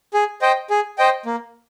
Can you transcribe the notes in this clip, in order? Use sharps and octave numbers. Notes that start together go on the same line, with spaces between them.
G#4
C5 D#5 G5
G#4
C5 D#5 G5
A#3